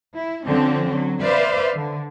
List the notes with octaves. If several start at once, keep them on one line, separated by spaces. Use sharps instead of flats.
E4
D3 F3 C4 C#4
F#3
B4 C5 D5 E5 F5
D3